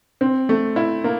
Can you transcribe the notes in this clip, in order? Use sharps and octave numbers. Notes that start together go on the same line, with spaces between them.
C4
A3
E4
A#3